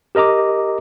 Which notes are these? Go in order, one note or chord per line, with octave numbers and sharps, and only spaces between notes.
G4 A#4 D#5 A#5 D6